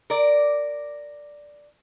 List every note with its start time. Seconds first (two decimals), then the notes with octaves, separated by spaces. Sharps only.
0.10 A#4 D5